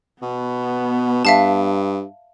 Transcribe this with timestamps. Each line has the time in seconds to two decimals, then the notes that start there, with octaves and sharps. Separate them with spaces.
0.22 B2 B3
1.25 G2 E5 F5 A5